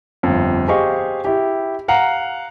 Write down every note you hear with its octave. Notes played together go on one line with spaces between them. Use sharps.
G1 F2
G4 G#4 C5 D#5 F5 C#6
E4 G4
F5 F#5 A#5